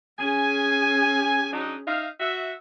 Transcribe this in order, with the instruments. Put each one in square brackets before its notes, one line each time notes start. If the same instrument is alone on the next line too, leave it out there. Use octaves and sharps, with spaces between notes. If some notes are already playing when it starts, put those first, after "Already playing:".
[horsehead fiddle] C#4 G#4 [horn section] G#5
[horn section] F#3 D4 D#4
D#4 E5 F5
F#4 E5